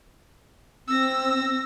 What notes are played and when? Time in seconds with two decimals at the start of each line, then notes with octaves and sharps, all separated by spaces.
0.88 C4 E6 A#6